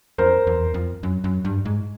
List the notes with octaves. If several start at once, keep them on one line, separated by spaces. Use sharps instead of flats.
F2 A#4 C5
E2
F2
F#2
F#2
G2
G#2